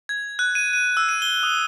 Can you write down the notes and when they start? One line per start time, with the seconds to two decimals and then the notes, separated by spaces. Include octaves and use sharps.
0.09 G#6
0.39 F#6
0.55 D#7
0.73 D#7
0.97 E6
1.09 D#7
1.22 G7
1.43 D#6